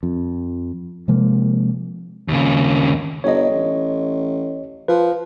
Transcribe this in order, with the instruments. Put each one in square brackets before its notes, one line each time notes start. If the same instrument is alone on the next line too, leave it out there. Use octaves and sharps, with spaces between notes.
[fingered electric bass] F2
C3 F3 G#3 A#3
[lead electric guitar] D#2 C#3
[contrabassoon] G1 [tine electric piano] C#5 D#5
[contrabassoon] A1
[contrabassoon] F3 [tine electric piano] B4